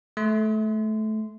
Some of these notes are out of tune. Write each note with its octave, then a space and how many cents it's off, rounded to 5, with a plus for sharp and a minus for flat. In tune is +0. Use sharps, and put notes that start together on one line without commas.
A3 -20 C6 -20